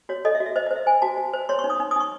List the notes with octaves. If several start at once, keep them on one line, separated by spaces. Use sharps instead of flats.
F#4 C#5
A4 D#5
E5
F#4
E5
C5 D#5
D#5
C5
E5
C5 G#5
F#4 A5
F#4
C5
C#5 C6
C#6
D#4
D#6
D#4
D#6
D#4 C#6